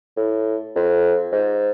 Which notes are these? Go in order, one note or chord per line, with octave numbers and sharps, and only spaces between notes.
A2
F2
G#2